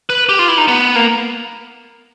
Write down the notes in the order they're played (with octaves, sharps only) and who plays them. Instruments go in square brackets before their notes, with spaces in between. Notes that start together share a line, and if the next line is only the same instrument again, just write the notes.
[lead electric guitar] B4
G4
F4
E4
D#4
B3
A#3